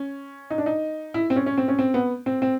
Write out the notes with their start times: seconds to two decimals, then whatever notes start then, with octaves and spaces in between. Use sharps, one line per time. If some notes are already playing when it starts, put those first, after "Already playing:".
Already playing: C#4
0.50 D#4
0.58 D4
0.66 D#4
1.14 E4
1.30 C4
1.36 C#4
1.46 C#4
1.58 C4
1.68 C#4
1.79 C4
1.94 B3
2.26 C4
2.42 C4